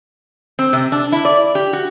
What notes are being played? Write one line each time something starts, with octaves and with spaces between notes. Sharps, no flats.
C4
C3
D4
E4
D5
G4
F#4